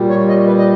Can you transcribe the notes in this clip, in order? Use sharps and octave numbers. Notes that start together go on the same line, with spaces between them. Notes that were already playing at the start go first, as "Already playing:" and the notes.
Already playing: A#2 G3
C#5
D#5
B4
D#5